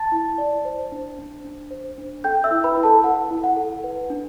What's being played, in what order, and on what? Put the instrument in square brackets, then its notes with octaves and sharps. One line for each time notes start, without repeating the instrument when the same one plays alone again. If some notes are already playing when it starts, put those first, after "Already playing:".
Already playing: [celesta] A5 A6
E4
D5
C5
D4
D4
D4
C5
D4
A4 G5 G6
E5 E6
E4
B4 B5
E4
A4 A5
E4 F#5
E4
F#5
A4
B4
D4